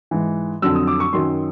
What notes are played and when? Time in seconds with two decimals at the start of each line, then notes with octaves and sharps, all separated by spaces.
0.11 G#2 E3
0.62 F2 D3 F#3 E6
0.75 D#6
0.87 D6
1.00 C#6
1.13 F#2 D#3 F#3 C6